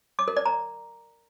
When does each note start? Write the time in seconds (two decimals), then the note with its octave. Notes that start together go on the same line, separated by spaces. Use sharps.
0.19 D6
0.28 A#4
0.37 D5
0.46 A#5